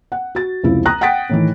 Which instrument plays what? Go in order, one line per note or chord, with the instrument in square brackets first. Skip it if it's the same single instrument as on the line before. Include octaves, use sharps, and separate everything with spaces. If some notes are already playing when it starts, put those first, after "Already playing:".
[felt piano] F#5
F#4 A6
F1 C#2 F3 E4
A#5 D#6 F#6 A#6
F#5 G5 D#6 A6 B6 D7
A2 D#3 E3